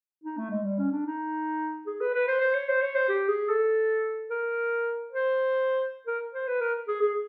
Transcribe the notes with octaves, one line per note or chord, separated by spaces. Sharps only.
D#4
A3
G#3
G3
C#4
D4
D#4
G#4
B4
B4
C5
C5
C#5
C5
C#5
C5
G4
G#4
A4
A#4
C5
A#4
C5
B4
A#4
G#4
G#4